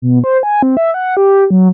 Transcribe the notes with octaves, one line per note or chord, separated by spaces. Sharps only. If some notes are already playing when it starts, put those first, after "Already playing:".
B2
C5
G#5
C4
E5
F#5
G4
F#3